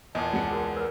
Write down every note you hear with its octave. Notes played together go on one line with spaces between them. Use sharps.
E2 A#2 D#5 A5
C#2 F#5 C#7
F#4 G#4 A#4
A#4 B4 A#5